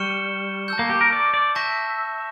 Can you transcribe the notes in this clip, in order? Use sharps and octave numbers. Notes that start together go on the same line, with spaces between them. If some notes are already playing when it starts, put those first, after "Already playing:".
Already playing: G3 C#6 F6 C#7 E7 G7
A5 E6 G6
A#3
G4
A#4
D5
D5
E5 A5 C#6 G6 A#6